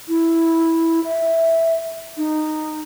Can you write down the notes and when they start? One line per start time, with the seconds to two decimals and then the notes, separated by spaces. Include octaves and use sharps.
0.08 E4
1.04 E5
2.17 D#4